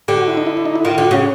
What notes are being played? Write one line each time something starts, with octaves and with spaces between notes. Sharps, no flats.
D3 G4
F#4
E4
D#4
E4
E4
D#4
E4
D#3 F4
D3 F4
F#4
C#3 C#4